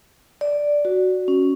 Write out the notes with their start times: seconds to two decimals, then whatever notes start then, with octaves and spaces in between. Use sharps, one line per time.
0.41 D5
0.85 F#4
1.28 C#4